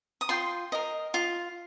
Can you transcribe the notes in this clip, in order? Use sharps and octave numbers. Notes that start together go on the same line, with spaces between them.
D#6
F4 G5 C6
A#4 D#5
F4